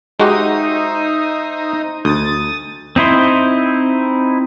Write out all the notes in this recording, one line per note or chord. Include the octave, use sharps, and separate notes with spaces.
G#3 D#4 F#4 G4 C5 E5 A#5 D#6
D2 D#6 A6
C4 D#4 E4 C5